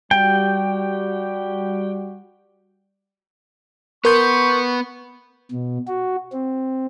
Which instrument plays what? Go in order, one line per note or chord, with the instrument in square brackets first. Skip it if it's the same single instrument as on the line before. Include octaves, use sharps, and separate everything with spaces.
[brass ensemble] G3 F#4 G4 [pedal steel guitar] G5
[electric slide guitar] B3 B4 [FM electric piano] A#4 C6 G6 [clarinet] C#6
[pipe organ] B2
F#4
C4